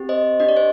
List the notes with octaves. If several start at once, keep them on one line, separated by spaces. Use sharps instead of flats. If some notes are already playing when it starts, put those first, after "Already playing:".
Already playing: C4 G4
C5 D#5
D4 G4 D#5
D5
C5